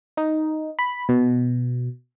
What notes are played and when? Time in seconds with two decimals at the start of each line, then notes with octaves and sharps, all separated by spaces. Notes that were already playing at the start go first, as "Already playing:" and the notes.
0.17 D#4
0.79 B5
1.09 B2